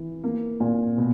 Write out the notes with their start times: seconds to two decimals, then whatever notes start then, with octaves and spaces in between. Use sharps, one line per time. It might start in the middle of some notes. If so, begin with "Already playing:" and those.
Already playing: E3
0.24 A#3
0.60 A#2
0.98 B2